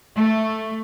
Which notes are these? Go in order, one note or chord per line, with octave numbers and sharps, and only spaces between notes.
A3